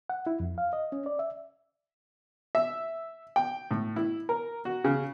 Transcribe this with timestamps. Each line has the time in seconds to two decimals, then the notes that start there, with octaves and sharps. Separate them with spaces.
0.10 F#5
0.27 E4
0.40 F2
0.58 F5
0.73 D#5
0.92 C#4
1.06 D5
1.19 E5
2.55 E5
3.36 G5
3.71 A2
3.96 E4
4.29 A#4
4.65 F#4
4.84 C#3